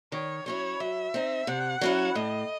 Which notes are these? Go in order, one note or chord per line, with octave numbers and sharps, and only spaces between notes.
D#3 C#5
F#3 C#4 E4 C#5
F#3 E5
C4 D#4
C3 F#5
F#3 C#4 E4
A2 D#5